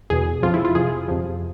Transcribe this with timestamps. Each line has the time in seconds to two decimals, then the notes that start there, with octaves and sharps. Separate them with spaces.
0.10 E2 B2 G#4
0.43 F2 C3 F3 F4
0.54 E4
0.65 F4
0.75 F2 C3 F3 G#4
1.08 F2 C3 F3